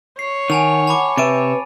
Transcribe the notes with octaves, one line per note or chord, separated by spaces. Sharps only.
C#5 C7
D#3 F#5 G#5 A5 F7
A5 B5 D6
C3 B4 E5 A6 D7 D#7